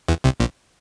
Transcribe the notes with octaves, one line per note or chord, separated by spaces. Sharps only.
E2 E3
C2 C3
A#1 A#2